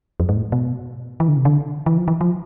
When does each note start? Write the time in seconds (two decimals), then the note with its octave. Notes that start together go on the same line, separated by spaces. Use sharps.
0.20 F2
0.29 G#2
0.37 A2
0.52 B2
1.20 E3
1.28 D3
1.37 C3
1.45 D3
1.86 E3
1.97 F3
2.08 E3
2.21 F3